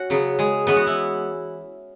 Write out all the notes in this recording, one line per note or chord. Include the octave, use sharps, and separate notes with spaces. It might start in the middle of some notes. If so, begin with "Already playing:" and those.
Already playing: C#4 F#4
C#3 F#3 B3
G#3 G#4
E3 G#3 B3 C#4 B4
F#4
E4